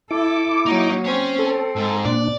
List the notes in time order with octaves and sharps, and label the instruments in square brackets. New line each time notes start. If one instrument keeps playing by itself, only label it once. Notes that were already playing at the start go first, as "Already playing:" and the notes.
[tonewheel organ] E4 D6 [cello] A4
[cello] F#3 A#3 [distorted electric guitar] D#4
[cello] C4 C5 [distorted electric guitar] C#4 C#5
[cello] C4 [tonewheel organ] A4
[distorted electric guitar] G#2
[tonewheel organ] A#2 D4 [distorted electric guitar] D5